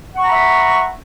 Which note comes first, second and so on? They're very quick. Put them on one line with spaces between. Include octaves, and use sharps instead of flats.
F#5 C#6 A#5 B5 E5